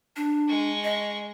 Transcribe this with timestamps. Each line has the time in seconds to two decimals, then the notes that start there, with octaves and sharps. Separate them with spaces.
0.16 D4
0.48 G#3 C#6
0.84 D#5